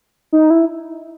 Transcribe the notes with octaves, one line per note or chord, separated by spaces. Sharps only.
D#4
E4